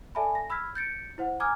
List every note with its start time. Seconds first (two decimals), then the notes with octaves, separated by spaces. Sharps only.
0.15 A4 D5 E5 G#5 A5 B5
0.35 A#6
0.50 B5 E6 F6 G#6 B6
0.75 G6 A6 C#7 D7
1.18 E4 C5 F#5
1.40 G#5 A#5 D6 D#6 F6 G#6